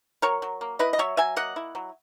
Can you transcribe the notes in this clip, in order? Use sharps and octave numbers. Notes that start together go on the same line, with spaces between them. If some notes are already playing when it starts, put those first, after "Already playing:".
F#3 A#4 C#5
F#3
A#3
E4 B4 D#5
D#5
F#3 C#5 E5
F#3 E5 G#5
A#3 D#5 F#5
E4
F#3